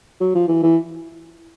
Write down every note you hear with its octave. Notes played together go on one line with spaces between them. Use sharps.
F#3
F3
E3
E3